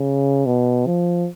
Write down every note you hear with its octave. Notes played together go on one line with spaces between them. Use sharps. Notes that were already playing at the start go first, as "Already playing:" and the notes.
Already playing: C#3
B2
F3